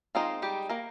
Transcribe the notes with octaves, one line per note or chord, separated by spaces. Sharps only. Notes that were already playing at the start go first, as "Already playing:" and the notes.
G#3 C4 D#4 F4
G3 G4
A#3 A#4